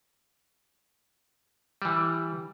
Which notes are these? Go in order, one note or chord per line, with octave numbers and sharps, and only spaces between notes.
E3 G3